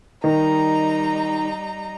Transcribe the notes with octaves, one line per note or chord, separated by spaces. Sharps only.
D#3 G3 D#4 A#5